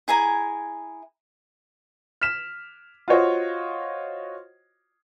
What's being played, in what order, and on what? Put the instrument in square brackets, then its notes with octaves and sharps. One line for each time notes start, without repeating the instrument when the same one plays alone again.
[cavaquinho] E4 G#4 G#5 A#5
[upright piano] F6 B6 E7
F4 F#4 C5 C#5 D#5